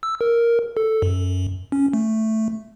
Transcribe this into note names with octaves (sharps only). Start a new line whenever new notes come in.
E6
A#4
A4
F#2
C#4
A3